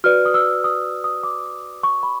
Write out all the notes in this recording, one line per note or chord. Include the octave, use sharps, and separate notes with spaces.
F#4 B4 D5 F6
D#6
E6
D#6
D#6
D6
C#6
B5